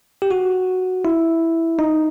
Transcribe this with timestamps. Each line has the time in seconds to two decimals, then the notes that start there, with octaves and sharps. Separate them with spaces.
0.22 G4
0.31 F#4
1.05 E4
1.79 D#4